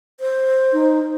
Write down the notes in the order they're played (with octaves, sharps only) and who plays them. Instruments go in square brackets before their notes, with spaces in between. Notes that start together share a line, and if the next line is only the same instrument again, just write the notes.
[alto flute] C5
[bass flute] D#4